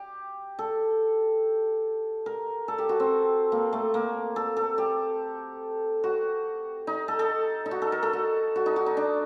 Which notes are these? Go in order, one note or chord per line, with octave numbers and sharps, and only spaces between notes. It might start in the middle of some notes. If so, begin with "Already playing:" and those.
Already playing: G4
A4
A#4
A4
G4
F#4
C4
A#3
A3
A#3
A4
A4
G4
F#4
D#4
A4
A4
D#4
F#4
A4
A#4
A4
F#4
F#4
D#4
F#4
D#4
D4